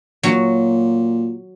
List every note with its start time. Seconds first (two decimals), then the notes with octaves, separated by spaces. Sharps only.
0.23 A#2 F#3